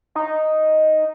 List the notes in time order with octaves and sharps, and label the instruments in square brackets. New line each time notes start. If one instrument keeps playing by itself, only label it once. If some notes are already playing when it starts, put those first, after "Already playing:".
[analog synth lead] D#4